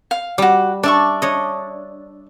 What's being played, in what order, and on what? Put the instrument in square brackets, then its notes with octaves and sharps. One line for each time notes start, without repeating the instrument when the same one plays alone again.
[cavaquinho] F5
[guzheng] G3 [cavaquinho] F#4 D6
[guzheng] D4 [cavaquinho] D5 E5 C#6
[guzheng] D4 C#5 D#5